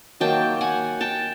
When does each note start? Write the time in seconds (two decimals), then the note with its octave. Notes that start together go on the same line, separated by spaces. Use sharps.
0.20 D#3 F#3 A#3 G5 A5
0.61 F#5 G#5
1.01 G5 A5